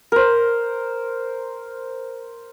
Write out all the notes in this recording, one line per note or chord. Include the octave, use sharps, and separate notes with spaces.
A#4 C5